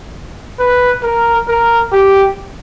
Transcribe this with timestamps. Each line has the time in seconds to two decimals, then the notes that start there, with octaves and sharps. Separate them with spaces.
0.60 B4
1.03 A#4
1.48 A#4
1.93 G4